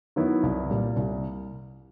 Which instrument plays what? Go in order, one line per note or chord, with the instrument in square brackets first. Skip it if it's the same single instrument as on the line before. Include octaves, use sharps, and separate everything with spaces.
[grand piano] D#3 F#3 B3 E4
C2
A#2 G3
C2